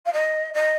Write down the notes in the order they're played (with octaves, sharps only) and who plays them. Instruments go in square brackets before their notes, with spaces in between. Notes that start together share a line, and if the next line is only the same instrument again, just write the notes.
[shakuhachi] F5
D#5
D#5